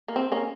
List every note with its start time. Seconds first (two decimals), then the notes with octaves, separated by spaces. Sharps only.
0.08 A#3
0.16 C4
0.32 A#3 C#4